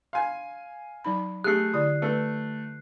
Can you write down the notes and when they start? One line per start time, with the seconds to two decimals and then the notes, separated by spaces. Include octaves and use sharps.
0.13 F5 G#5 C6
1.04 F#3 D#4 B5
1.44 A3 G4 G#4 F#6 C7
1.74 D3 E4 D5 D#6
2.02 A3 A4 B4